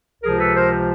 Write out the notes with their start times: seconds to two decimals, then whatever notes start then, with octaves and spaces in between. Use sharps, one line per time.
0.22 C#2 C3 F3 G#4 A#4
0.39 A4 B4
0.55 A#4 C5